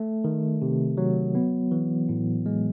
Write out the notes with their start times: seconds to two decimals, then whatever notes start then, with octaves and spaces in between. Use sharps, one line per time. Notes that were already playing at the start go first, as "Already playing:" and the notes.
Already playing: A3
0.24 D#3
0.62 C3
0.97 F#3
1.35 B3
1.71 E3
2.09 A2
2.46 G#3